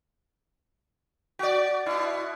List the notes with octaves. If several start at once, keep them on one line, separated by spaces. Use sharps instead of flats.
F#4 D5
B2 E4